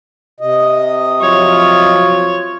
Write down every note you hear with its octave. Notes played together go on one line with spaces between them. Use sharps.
C3 D#5
F3 F#3 F4 C#5